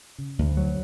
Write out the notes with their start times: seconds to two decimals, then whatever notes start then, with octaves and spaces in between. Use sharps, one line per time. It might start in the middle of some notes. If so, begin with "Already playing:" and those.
0.18 C#3
0.38 D2
0.57 F#3